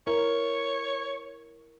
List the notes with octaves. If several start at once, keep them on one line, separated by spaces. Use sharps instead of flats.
E4 A#4 C#5